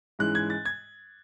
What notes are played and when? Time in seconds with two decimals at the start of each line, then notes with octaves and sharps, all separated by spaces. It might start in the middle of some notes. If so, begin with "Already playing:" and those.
0.19 G#2 E3 G#3 C#4 F#6
0.35 G#6
0.50 A6
0.65 G#6